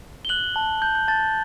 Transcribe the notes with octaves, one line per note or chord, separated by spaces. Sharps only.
G7
F#6 F#7
A5
A5 G6
G6
A5 A6